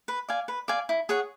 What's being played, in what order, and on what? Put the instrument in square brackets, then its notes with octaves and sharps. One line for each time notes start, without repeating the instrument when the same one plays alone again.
[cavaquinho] B4
D5 F5 G#5
B4
D5 F5 G#5
E4
G#4 C#5 F#5